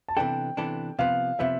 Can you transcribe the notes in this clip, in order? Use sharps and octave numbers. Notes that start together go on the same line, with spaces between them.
A5
C3 E3 B3 D4 A4 G5
C3 E3 B3 D4 A4
C3 F3 B3 F5
C3 F3 B3 E5